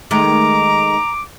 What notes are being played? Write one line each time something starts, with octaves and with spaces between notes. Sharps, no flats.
D#3 G#3 A3 A#5 D6